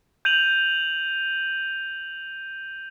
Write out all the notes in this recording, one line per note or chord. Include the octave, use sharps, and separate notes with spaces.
G6 D#7 F7 F#7